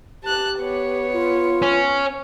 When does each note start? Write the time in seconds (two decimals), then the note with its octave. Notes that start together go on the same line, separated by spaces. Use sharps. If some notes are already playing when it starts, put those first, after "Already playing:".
0.23 G4 A5 F#6
0.59 B3 C#5
1.13 F4
1.62 C#4